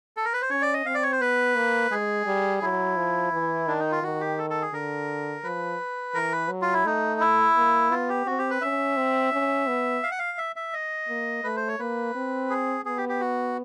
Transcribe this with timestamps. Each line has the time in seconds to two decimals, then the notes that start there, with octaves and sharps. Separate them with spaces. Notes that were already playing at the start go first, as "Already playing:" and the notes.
0.17 A4
0.25 A#4
0.33 B4
0.42 C5
0.50 C#4 C#5
0.62 D5
0.74 D#5
0.86 C4 F5
0.94 D5
1.03 C#5
1.12 C5
1.21 B3 B4
1.56 A#3
1.91 G#3 G#4
2.26 G3
2.62 F#3 E4
2.97 F3
3.33 E3
3.67 D#3 D4
3.79 D#4
3.91 F4
4.03 D#3 F#4
4.21 G4
4.38 A4
4.50 A4
4.62 G#4
4.73 D3 A#4
5.44 F3 B4
6.14 E3 A#4
6.32 B4
6.50 F#3
6.62 F4
6.74 E4
6.85 A3 D#4
7.21 E4
7.56 A#3
7.91 B3 F4
8.09 G4
8.26 C4 F#4
8.38 G4
8.50 B4
8.61 C#4 E5
8.97 C4
9.33 C#4
9.68 B3
10.03 F5
10.11 F#5
10.19 F5
10.38 E5
10.56 E5
10.73 D#5
11.09 A#3
11.44 A3 B4
11.56 C5
11.68 C#5
11.80 A#3 B4
12.15 C4
12.50 G#4
12.86 B3 G#4
12.98 G4
13.09 G4
13.20 F#4